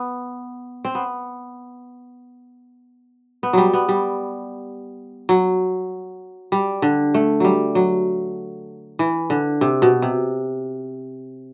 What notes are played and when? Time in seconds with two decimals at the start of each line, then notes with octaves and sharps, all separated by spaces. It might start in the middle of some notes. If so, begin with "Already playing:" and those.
Already playing: B3
0.85 C4
0.95 B3
3.43 B3
3.53 F#3 G3
3.73 B3
3.89 G3
5.29 F#3
6.52 G3
6.82 D3
7.14 A3
7.40 F#3 G3
7.75 F#3
8.99 E3
9.30 D3
9.61 C3
9.82 B2
10.02 C3